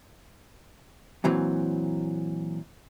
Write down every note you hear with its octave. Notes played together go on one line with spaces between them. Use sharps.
A#2 E3 F#3 C4